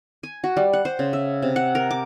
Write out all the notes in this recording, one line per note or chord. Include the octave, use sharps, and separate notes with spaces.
G#5
F#4
G3
F#5
C5
C#3
E5
C3
F#5
A#4
D6